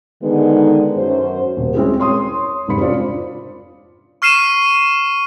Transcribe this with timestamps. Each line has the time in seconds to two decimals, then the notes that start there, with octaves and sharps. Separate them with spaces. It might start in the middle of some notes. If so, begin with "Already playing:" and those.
0.23 D3 D#3 G#3 B3 D#4
0.97 F#2 C5
1.57 D#1
1.75 G#3 C4 C#4 E4 G#4
1.99 C#5 C6 D#6
2.68 F1 G#2 C3 B5 C#7
2.81 C#4 D4 F4 C5 D5
4.22 C#6 F6 C7 D#7 E7